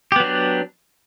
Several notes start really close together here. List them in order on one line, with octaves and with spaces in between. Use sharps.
G4 B3 F#3 D4